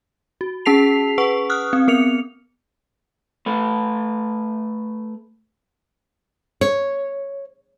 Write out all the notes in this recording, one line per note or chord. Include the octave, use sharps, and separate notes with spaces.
F#4
C#4 G#4 A5 B6 C7 F7
B4 F#5 C#6
D#6 F6 F#6
C4
B3 A#4 C#7 F7
A3 B4
C#5